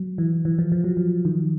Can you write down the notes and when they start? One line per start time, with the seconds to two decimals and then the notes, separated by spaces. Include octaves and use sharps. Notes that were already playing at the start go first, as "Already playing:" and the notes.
Already playing: F#3
0.18 E3
0.45 E3
0.59 F3
0.72 F3
0.84 F#3
0.97 F3
1.25 D#3